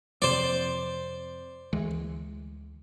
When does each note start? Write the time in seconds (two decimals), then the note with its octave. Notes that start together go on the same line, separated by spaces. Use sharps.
0.22 F2 C3 C5 D5
1.73 D2 E3 G#3